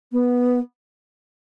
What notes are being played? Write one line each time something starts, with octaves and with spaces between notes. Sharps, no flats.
B3